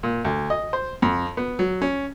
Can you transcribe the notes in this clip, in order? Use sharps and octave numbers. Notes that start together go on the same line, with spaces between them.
A#2
D2
D#5
C5
F2
B3
F#3
C#4